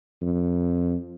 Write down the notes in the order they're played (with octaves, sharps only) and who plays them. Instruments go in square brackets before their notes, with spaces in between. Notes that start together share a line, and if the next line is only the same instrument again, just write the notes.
[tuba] F2